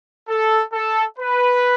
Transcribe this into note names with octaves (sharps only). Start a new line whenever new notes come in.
A4
A4
B4